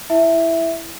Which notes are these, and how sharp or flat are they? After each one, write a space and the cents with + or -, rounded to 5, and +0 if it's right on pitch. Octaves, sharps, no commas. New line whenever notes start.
E4 +5 E5 +0